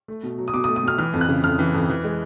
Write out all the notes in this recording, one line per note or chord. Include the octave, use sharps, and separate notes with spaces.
A3
B2
F#3
D#6
B2 D6
D#6
A3
D#6
B2 F6
E3 F6
F2
F#6
C#3
F2 F6
E3
F2
E3
G#3